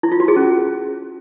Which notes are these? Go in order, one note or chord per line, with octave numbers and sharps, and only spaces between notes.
E4
F4
F#4
G#4
C#4